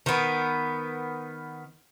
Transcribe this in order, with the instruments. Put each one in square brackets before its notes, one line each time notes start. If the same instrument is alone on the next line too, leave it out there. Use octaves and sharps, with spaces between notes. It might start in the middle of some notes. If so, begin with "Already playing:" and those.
[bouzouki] D#3 B3